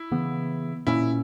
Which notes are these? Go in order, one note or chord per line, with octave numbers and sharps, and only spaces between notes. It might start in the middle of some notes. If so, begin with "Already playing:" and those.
Already playing: E4
C#3 E3 B3
A#2 A#3 C#4 E4